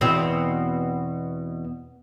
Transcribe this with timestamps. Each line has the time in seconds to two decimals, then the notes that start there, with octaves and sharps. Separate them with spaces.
0.01 E2 B2 C4